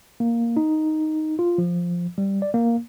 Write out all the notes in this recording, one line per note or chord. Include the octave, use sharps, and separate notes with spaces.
A#3
D#4
F4
F3
G3
D5
A#3